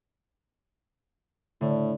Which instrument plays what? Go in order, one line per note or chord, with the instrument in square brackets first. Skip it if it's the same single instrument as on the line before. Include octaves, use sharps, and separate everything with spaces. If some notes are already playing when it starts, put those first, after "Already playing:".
[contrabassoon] A2 [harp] D3